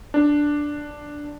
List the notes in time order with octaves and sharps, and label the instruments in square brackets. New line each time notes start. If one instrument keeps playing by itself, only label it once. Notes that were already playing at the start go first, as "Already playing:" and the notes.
[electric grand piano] D4